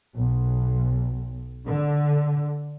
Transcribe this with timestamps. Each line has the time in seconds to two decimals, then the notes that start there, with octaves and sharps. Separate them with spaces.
0.15 B1
1.65 D3